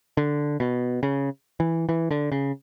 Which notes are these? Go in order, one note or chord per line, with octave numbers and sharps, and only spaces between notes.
D3
B2
C#3
E3
E3
D3
C#3